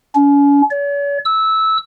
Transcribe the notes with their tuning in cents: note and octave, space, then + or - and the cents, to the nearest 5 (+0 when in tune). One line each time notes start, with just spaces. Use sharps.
C#4 +40
C#5 +45
E6 -15